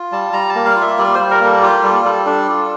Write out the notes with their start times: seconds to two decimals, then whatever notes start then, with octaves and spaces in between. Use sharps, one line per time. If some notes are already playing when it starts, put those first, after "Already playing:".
Already playing: F4
0.12 G3 A5
0.33 G3 A#5
0.49 A5
0.56 A#3
0.66 F5
0.76 F4
0.82 E5
0.98 G3 D5
1.15 G3 C5
1.31 A#4
1.41 A#3 A4
1.62 F4 G4
1.83 G3 A4
2.05 G3 A4
2.26 D4 A4
2.49 F4